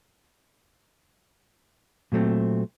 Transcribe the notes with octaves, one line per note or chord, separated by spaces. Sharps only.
A#2 F#3 A3 C4